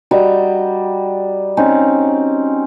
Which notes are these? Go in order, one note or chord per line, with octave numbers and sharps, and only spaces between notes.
G3 F#4 D#5 A#5
C4 C#4 D#4